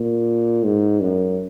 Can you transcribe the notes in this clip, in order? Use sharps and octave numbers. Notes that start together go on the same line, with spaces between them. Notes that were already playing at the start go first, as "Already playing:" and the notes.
Already playing: A#2
G#2
F#2